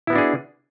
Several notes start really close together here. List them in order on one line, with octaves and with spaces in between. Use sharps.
E4 B3 F#4 D4 G#4